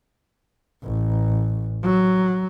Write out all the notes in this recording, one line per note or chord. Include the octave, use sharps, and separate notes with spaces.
A1
F#3